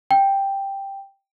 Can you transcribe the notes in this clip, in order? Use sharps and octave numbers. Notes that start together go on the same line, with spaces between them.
G5